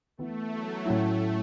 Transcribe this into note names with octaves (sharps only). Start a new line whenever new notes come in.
E3 A3 B3 E4
F#3
A2 F#3 A3 C#4 E4